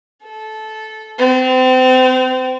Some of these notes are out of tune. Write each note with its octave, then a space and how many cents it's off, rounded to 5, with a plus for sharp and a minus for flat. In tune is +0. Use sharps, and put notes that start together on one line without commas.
A4 -15
C4 -30